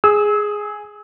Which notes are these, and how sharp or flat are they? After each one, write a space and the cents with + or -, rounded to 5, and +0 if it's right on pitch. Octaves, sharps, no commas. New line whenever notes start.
G#4 +0 E6 -35